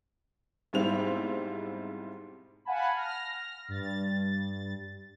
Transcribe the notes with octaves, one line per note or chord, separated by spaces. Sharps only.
B1 G#2 G3 C4 E4 F7
F5 F#5 G#5 A5 B5
F6 A#6
G2 A6